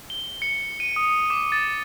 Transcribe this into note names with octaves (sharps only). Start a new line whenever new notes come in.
G7
C#7
D#7
D#6
D6
A6